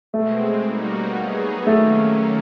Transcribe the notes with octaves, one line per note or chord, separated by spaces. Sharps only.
B2 G#3 A3 C4
G3 A#3 D#4 F#4
F#3 B3 D#4 G#4
D#3 F#3 A3 A#3 C#4